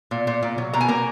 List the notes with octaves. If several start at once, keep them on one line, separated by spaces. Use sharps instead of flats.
A#2
A#2
A#2
F#3
B2 A#5
G#5
A#3 A#5